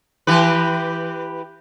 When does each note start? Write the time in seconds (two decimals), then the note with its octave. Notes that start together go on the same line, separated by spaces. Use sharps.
0.27 E3 G4 B4